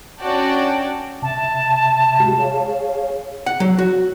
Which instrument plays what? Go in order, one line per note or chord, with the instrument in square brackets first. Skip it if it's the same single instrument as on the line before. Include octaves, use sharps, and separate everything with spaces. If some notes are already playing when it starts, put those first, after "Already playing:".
[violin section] C#4 D4 F#4 D5 G5 A5
[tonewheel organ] C3 E5 [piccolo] A5
[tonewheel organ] G#3 F#4 G4
G#4 C#5 F5
[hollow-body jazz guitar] F#5
F#3
F#4